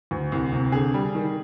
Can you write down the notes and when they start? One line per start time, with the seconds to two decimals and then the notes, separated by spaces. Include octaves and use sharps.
0.11 D2
0.32 C2
0.52 C3
0.72 D3 G#4
0.94 G3
1.15 D#3